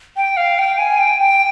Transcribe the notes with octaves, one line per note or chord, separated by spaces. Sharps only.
G5
F5
G5
G#5
G5
G5